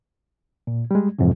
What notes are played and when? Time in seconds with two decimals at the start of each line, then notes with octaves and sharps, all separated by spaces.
0.67 A#2
0.91 G3 G#3
1.19 F2 G#2 C3 E3